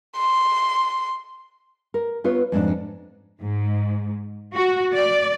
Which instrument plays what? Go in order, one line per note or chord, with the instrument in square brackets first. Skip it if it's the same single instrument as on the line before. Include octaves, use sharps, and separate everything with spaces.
[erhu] C6
[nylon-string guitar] A#4
B3 F4 B4 C#5
F2 G#2 D4
[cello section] G#2
F#4
D5